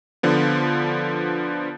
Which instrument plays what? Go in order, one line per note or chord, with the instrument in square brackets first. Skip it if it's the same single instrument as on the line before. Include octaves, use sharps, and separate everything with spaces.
[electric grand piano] D3 F3 B3